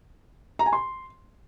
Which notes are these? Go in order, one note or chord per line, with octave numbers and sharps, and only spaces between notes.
A#5
G#5
C6